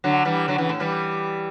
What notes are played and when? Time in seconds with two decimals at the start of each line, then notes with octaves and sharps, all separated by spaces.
0.04 D3 F#3
0.25 E3 G3
0.48 D3 F#3
0.58 C#3 E3
0.69 A2
0.80 E3 G3